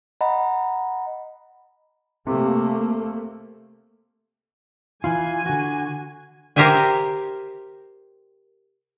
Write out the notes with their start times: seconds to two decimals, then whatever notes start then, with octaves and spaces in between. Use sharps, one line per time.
0.21 D#5 F#5 A#5 B5
2.27 C3 A3 A#3
5.04 E3 E4 F4 G#5
5.46 D3 F#4
6.56 G4 A#4 C5 E5 G5 G#5